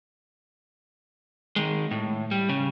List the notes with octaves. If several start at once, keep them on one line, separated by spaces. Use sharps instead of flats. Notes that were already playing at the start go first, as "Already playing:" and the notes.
D#3 G#3
A2
G3
C#3